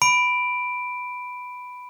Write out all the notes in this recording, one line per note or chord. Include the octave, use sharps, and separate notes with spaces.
B5 D7